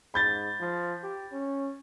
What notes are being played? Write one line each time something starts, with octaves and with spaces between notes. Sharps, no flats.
G#2 B5 G6 A6
F3
G4
C#4